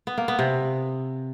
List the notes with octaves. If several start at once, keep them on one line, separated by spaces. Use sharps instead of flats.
B3
A#3
B3
C3